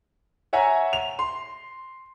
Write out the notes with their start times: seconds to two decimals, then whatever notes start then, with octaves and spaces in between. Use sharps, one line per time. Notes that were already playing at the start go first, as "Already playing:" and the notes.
0.53 C#5 E5 F#5 G#5 A#5
0.93 F7
1.19 C6